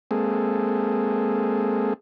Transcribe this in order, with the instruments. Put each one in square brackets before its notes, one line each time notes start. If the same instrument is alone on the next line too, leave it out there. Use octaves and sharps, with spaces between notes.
[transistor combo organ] G#3 A#3 C4 G#4 A4